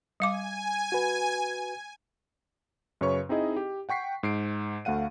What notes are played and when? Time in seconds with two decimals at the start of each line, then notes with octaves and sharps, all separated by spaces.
0.20 G3 F5 G#5 D6
0.92 F#4 B4
3.01 F#2 C#3 B4 C#5 C#6
3.29 C4 D#4 E4 G#4 D#5
3.56 G4
3.89 F#5 G5 C#6 B6 C7
4.23 G#2 C7 D7
4.85 D2 A3 F5 F#5 D#7